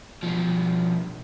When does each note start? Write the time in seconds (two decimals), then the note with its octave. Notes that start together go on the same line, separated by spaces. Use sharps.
0.23 B2 F3